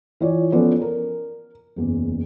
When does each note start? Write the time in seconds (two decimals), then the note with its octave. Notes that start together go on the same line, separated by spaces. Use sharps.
0.20 E3 F4 C#5 D5
0.52 F3 B3 C#4 A4 C5 D5
0.82 A#4
1.76 F#1 E2